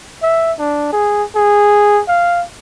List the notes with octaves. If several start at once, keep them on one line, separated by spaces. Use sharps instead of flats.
E5
D4
G#4
G#4
F5